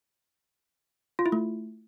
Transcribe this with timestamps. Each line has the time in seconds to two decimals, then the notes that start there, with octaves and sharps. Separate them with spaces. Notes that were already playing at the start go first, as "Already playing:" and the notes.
1.19 F4
1.26 E4
1.32 A3